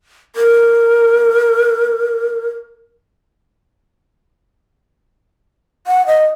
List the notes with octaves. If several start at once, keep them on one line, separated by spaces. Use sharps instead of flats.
A#4
F#5
D#5